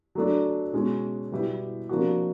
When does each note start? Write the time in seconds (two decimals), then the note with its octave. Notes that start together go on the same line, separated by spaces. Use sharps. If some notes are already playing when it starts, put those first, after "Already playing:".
0.15 F#3 A3 D4
0.73 B2 G#3 C#4
1.32 B2 G3 B3 E4 G4
1.89 C3 F3 A#3 D4 F#4